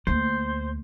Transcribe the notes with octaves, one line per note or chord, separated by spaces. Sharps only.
D2 A#3 C5